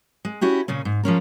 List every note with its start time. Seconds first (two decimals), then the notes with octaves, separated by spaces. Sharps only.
0.25 G#3
0.41 C#4 E4 F#4 G4
0.68 A#2 C#3 C#4
0.85 G#2
1.03 F3 G#3 C#4 A#4